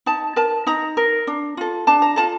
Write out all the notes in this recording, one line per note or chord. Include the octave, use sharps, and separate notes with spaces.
D#4 A5
A#4 A5
D#4 A#5
A#4
D4
F4 A4
D4 A5
A#5
F4 A4 A5